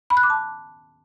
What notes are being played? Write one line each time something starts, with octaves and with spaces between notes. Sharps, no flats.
B5
F#6
D6
A5